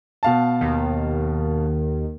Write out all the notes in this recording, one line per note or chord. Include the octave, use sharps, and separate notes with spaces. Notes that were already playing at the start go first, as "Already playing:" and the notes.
B2 F5 A5
D#2 D#3